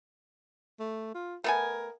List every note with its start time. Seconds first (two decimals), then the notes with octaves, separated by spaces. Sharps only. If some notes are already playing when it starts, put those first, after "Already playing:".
0.80 A3
1.14 F4
1.44 A3 B3 A#4 G#5